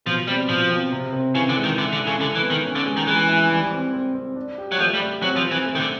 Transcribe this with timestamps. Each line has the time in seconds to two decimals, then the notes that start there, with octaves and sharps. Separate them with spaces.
0.06 B2 F3
0.27 G3 C4
0.49 B2 F3
0.70 C4
0.92 C3
1.13 C4
1.35 C#3 E3
1.49 D3
1.57 G#3
1.64 D#3
1.78 D3 E4
1.93 D3
1.99 A4
2.07 C#3
2.21 D3 A4
2.35 E3
2.43 B3
2.50 D#3
2.65 C#4
2.75 D3
2.86 G#3
2.97 D#3
3.07 E3 G#3
3.28 E4
3.50 G3
3.72 C4
3.93 C4
4.15 C4
4.36 D4
4.58 G4
4.72 F#3
4.79 F3 A3
4.94 G3
5.01 G4
5.22 F#3 C4
5.36 F3
5.45 C4
5.51 E3
5.66 A3
5.75 D#3
5.80 D3